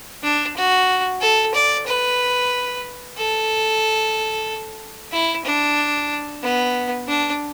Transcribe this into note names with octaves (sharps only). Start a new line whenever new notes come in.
D4
F#4
A4
D5
B4
A4
E4
D4
B3
D4